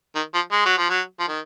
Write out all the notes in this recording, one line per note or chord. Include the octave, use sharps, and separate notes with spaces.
D#3
F3
G#3
F#3
F3
F#3
F3
D#3